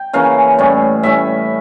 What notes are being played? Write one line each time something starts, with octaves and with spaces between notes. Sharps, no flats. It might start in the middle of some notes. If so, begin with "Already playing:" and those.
Already playing: G5
C#3 E3 A#3 C#4 F5
A2 G3 C#4
A2 G3 C#4 E5